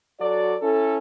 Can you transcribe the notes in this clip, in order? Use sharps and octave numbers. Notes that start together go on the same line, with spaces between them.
F#3 F#4 A4 D5
C#4 E4 A4